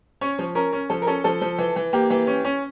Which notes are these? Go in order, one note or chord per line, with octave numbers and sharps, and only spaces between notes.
C#4 C#5
F3
C#4 A#4
C#4
F3 A4
A#4
C#4 A4
F3 A4
F3
E3
E3
A#3 G4
E3
C#4
C#4